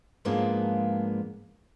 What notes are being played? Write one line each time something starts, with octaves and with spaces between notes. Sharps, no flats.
G#2 F3 G#3 A#3 B3 D4